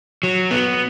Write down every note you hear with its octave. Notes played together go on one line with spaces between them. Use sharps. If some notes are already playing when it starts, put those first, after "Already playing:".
F#3
B3